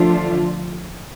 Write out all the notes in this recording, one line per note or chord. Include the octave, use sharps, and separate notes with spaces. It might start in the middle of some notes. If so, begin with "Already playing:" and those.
Already playing: D3 F3 A3 D4 F4